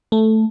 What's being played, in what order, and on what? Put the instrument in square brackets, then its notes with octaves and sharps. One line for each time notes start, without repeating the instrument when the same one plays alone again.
[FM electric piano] A3